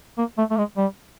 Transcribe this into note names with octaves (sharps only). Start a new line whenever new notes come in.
A#3
A3
A3
G#3
G3